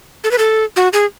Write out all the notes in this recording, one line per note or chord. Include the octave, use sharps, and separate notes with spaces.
A4
B4
A4
F#4
G#4